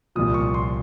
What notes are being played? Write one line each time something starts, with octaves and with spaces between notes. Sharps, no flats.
C2 A#2 F3 D#6
C#6
C6